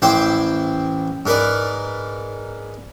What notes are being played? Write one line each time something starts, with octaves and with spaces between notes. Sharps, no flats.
A1 E4 C5 G5 C6 D6
G#2 A#4 B4 D5